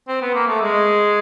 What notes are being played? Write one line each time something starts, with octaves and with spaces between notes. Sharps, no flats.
C4
B3
A#3
A3
G#3